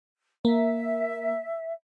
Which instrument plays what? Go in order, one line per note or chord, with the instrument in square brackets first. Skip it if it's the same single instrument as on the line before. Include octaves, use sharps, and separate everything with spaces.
[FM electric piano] A#3 [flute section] E5